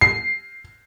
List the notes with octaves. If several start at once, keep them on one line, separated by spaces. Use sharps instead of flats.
C7